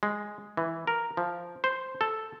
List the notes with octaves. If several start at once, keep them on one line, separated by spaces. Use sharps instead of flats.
G#3
E3
A#4
F3
C5
A4